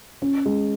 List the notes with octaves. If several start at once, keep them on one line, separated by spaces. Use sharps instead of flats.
C#4
G#3